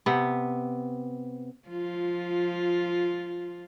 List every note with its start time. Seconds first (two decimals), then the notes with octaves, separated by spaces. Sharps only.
0.06 C3 B3
1.68 F3 F4